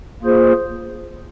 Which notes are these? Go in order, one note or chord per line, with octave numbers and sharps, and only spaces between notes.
A#3 F4 G#4 C5